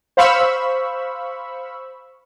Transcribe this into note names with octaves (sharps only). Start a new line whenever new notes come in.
C5 F5 B5 C#6 E6